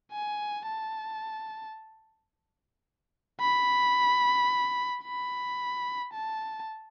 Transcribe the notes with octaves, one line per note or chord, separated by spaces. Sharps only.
G#5
A5
B5
B5
A5